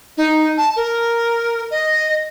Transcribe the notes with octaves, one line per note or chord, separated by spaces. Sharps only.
D#4
A5
A#4
D#5